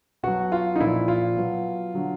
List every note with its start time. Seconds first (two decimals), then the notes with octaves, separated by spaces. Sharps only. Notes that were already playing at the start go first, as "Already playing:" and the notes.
0.23 B2 F#3 F#4
0.52 F4
0.76 D#4
0.80 A#2 F3 E4
1.08 F4
1.36 B2 F#3
1.94 D3 F#3